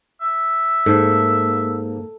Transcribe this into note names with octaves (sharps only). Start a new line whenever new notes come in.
E5
G#2 A#3 A4